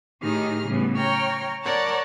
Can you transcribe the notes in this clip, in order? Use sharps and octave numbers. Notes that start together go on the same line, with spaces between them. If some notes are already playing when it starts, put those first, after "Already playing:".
A2 D#3 D#4 G4 G#4 F6
A2 C#3 G3 B3
C#5 G5 A#5 F6
A#4 C#5 D5 F#5 A5